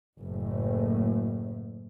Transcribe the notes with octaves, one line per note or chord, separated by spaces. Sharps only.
F#1 A2